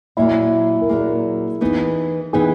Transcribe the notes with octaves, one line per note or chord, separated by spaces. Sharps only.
A#2 F#3 A#3 E4
A#4
A#2 F#3 A#3 G#4
E3 B3 D#4
E3 B3 D#4 G#4